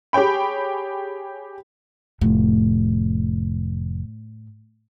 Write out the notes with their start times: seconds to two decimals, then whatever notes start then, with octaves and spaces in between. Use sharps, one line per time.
0.13 G4 G#4 C#5 G5 B5
2.21 F1 A2